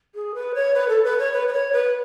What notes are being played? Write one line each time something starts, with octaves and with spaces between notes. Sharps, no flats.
G#4
B4
C#5
B4
A4
B4
C#5
B4
B4
C#5
B4